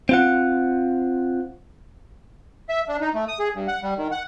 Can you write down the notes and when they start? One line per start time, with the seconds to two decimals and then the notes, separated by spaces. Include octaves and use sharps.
0.09 C4 F4 F#5
2.69 E5
2.88 D4
3.01 D#4
3.15 A3
3.28 D#6
3.40 G#4
3.55 G2
3.68 F#5
3.83 G3
3.97 D#3
4.12 F#5